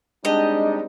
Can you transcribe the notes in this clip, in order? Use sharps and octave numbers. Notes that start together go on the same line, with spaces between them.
G3 G#3 C4 D4 D#4 G4 D#5